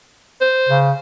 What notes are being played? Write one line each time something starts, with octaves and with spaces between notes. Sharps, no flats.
C5
C#3